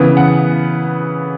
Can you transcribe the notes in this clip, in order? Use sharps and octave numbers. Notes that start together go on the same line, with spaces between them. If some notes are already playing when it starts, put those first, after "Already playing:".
Already playing: C#3 E3 B3
F#5